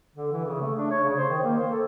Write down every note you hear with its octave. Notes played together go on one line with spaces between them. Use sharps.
D3
E3
C#3
A3
D4
C#5
C#3
C5
D#3
A#3
C5
A4